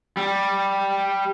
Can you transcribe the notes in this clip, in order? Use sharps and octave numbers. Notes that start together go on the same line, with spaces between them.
G3